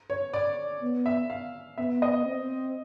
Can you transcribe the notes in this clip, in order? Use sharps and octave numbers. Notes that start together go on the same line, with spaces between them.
C#5
D5
B3
E5
F5
B3 E5
D#5
C4